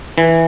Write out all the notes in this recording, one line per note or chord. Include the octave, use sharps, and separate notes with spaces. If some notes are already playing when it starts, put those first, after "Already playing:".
E3